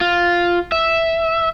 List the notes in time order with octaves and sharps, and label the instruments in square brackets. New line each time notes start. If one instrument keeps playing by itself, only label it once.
[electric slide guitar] F4
E5